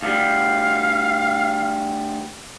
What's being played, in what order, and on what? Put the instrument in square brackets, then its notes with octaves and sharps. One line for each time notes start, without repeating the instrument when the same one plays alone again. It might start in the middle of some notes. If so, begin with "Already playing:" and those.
[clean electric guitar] D2 G3 [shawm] F5